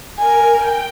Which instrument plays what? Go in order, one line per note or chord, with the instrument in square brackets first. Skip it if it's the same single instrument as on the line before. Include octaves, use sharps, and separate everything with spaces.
[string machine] A#4 [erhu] G#5
[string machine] G5